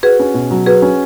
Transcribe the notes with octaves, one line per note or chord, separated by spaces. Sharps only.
F#4 G#4 B4
C#4
B2
F#3
F#4 G#4 B4
C#4